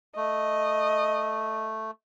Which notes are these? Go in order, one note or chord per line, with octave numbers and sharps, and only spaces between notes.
A3 D#5